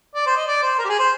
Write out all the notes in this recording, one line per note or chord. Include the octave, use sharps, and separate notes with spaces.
D5
C5
D#5
D5
C5
A#4
G4
G#4
C5